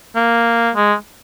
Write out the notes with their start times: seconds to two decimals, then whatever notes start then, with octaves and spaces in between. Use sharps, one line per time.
0.16 A#3
0.76 G#3